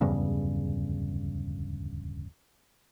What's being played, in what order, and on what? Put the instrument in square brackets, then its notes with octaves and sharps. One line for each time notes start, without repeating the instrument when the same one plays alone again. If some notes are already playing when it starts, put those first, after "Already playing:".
[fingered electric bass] D1 E2 G2 C#3